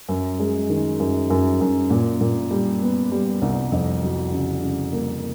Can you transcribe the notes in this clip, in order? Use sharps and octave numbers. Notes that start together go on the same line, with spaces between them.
F#2
G#3
D#3
F#2
F#2
F#2
A#2
A#2
G3
B3
G3
C2
F2
F#3
C#3
C#3
A#3